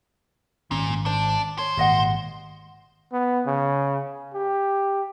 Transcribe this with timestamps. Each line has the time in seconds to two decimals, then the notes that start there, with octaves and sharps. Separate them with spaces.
0.71 G#1 A#2 C#4
1.06 D4 C5
1.58 C5 C#5
1.77 G#1 A#2 G4 D#5 F#5
3.12 B3
3.46 C#3
4.34 G4